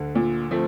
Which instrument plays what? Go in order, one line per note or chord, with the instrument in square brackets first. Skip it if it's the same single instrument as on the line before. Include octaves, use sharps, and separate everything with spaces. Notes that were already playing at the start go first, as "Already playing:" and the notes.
Already playing: [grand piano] D2 D3
[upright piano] A#2
F3 A3 C4